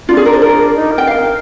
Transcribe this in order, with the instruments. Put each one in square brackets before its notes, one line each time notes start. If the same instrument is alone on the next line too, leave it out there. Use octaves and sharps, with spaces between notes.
[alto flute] D4 [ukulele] F4
[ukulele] G#4
A#4
C5
A#4
[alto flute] D#4
A#4
[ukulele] G5
F5